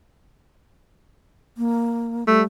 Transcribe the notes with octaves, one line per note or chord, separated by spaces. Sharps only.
A#3
G3 A3